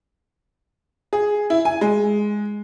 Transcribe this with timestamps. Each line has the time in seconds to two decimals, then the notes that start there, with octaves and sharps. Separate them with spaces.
1.13 G#4
1.50 E4
1.65 G#5
1.81 G#3